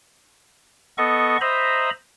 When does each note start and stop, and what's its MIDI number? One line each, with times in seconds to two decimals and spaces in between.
0.98 1.37 59
0.98 1.37 69
0.98 1.37 75
0.98 1.37 85
1.41 1.90 72
1.41 1.90 75
1.41 1.90 76
1.41 1.90 82
1.41 1.90 83